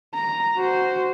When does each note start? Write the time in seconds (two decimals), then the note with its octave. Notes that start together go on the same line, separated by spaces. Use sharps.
0.15 A#5
0.57 F#4 C5